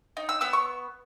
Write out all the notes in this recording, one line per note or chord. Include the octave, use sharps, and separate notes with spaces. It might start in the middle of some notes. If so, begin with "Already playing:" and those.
D#4
E6
B3 E6
C#6